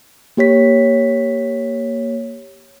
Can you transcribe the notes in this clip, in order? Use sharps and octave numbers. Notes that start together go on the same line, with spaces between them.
A#3 G4 C#5 B6